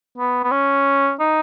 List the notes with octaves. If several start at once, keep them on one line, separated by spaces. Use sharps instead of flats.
B3
B3
C#4
D#4